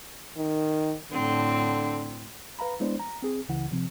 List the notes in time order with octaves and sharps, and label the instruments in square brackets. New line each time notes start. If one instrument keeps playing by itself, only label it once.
[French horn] D#3
[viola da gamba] A2 C4 [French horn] D3
[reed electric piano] B4 F5 A#5 B5
G#3 B3 D4 E4 C5 D5
A#5
C4 G#4
C#2 C#3 E3 E4 F#5
C3 F3 C4